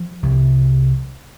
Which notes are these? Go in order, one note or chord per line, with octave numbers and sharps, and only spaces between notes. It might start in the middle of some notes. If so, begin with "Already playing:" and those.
Already playing: F3
C2 C3